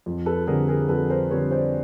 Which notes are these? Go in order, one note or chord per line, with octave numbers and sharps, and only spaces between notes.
F2
A4 B4
D3 G3 C4 G#4 A#4
G#4 A#4
F2 A4 B4
A#4 C5
D3 G3 C4 B4 C#5
C5 D5